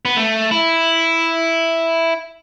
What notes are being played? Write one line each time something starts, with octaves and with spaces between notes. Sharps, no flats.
B3
A3
E4